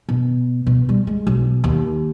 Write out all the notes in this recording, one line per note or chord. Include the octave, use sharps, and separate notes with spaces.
B2
B2
G3
G#3
B1
D#2